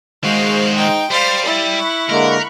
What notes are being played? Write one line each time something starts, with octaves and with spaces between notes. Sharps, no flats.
D#3 G#3 F#4 C5 F5
D#4 G5
G3 C5 F5 A6
E4
B5 C#6 F#6
D3 G#3 A#3 A#4